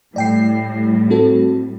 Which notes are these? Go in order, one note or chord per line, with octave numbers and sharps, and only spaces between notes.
A2 G3 D5 G5 C7
C4 F#4 A4